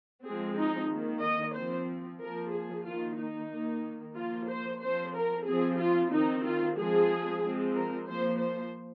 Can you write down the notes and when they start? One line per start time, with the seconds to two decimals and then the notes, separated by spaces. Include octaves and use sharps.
0.25 F3 G#3 C4 G#4
0.57 D#4
0.90 D#3 A#3
1.22 D#5
1.55 F3 C4 C5
2.21 F3 A#3 A#4
2.53 G#4
2.86 D#3 A#3 F4
3.18 D#4
3.51 D#3 A#3
4.16 F3 A#3 F4
4.49 C5
4.82 F3 C4 C5
5.14 A#4
5.46 F3 C4 G#4
5.79 F4
6.12 D#3 C4 D#4
6.44 F4
6.77 F3 G#3 C4 G#4
7.43 F3 G#3 C4
7.75 A#4
8.08 F3 A#3 C5
8.41 C5